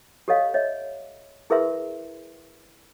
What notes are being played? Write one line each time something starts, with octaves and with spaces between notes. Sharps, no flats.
G4 A4 C#5 D#5 F5
C#5 D#5 E5
E4 G#4 A#4 B4 E5 C6